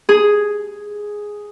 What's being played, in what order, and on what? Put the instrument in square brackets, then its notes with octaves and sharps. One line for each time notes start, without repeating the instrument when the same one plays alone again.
[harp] G#4